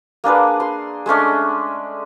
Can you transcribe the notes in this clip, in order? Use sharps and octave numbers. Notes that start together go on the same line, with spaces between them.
A#3 D4 G#4 B4
C6
G#3 A3 C#4 D4